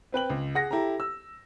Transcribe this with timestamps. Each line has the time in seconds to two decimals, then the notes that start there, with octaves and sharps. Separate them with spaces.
0.12 C4 B4 G5 F#7
0.30 C#2
0.55 G#4 F#5 A#6
0.71 E4 G4 A4 A#5
1.00 E6